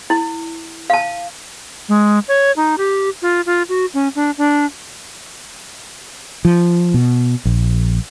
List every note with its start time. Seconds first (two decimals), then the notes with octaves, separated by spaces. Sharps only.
0.10 E4
0.90 F5 A5
1.89 G#3
2.28 C#5
2.56 D#4
2.78 G4
3.22 F4
3.46 F4
3.69 F#4
3.94 C#4
4.16 D4
4.38 D4
6.45 F3
6.94 B2
7.45 A#1